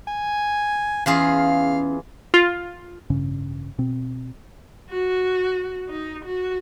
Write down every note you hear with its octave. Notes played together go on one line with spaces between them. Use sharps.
G#5
E2 C#4 F4 G#4 F5
F4
A1 G2 C#3 C#4
B2 C4
F#4
D#4
F#4